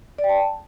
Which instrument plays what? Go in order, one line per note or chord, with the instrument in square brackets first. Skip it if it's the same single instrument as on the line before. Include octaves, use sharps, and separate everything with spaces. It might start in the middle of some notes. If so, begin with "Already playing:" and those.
[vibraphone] D5
G5
A5